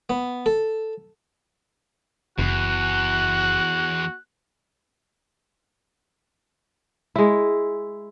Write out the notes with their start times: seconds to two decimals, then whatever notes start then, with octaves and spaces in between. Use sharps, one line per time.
0.10 B3
0.46 A4
2.38 F#1 E2 F#4 F#6
7.16 G#3 E4